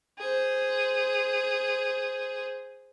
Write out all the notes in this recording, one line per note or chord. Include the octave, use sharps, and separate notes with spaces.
G#4 C5